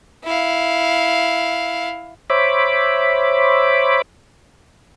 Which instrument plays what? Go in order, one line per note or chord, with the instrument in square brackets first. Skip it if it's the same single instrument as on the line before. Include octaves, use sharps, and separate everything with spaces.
[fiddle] E4 F5
[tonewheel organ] C5 C#5 E5 B5 D6